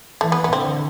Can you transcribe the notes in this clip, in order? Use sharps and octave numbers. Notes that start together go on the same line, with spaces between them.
E3 A3
B3
B3
D3 C4